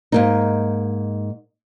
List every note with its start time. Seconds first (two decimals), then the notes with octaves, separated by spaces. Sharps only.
0.12 G#2 A#3 D#4